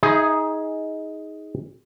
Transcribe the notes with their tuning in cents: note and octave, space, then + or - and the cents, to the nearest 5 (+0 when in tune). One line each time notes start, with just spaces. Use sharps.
D#4 +20 G#4 +0 E5 +0